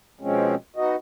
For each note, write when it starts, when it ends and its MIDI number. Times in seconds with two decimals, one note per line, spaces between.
0.21 0.55 47
0.21 0.55 53
0.21 0.55 56
0.21 0.55 60
0.21 0.55 61
0.76 0.96 59
0.76 0.96 63
0.76 0.96 66
0.76 0.96 75